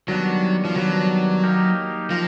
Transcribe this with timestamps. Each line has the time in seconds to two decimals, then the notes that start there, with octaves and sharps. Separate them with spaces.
0.08 D#3 F#3 G3 B3 D4
0.65 F3
0.76 D#3 F#3 G3 B3 D4
1.44 A#3 D#4 G4 A#4
2.10 F3 A#3 D#4 G4 A#4